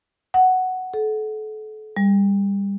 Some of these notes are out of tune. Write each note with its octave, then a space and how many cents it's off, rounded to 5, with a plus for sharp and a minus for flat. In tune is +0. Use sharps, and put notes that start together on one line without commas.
F#5 +5
A4 -35
G3 +20